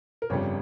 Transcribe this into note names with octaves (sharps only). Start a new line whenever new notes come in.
A#4
G1 F2 C#3 G3 C#5